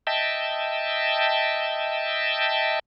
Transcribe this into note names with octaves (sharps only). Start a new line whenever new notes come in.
D#5 E5 G5 A5